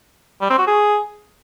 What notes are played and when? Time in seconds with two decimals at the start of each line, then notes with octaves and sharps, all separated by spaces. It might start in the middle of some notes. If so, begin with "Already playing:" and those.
0.41 G3
0.50 C4
0.59 F#4
0.67 G#4